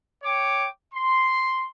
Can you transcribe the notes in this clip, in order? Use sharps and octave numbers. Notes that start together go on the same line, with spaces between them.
C#5 G5 D6
C6